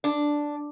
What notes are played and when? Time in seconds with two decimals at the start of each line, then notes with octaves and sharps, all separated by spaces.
0.04 D4